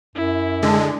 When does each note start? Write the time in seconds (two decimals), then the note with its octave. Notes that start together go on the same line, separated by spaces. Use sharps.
0.16 F#2 E4
0.63 D3 G#3